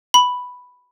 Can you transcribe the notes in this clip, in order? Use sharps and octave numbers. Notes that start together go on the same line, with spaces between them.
B5